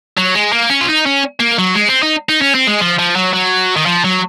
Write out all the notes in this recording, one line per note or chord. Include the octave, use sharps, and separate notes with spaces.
F#3
G#3
A#3
C#4
F4
D#4
C#4
A#3
F#3
G#3
C4
D#4
D#4
C#4
C4
G#3
F3
F3
F#3
F#3
D#3
F3
F#3